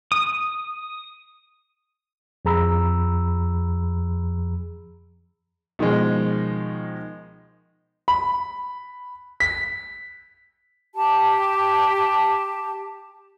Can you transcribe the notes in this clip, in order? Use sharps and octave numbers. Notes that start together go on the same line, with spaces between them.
D#6
F2 F3 G#4 A#5 B5 E6
B2 D#3 F3 G#3
B5
B6
G4 A5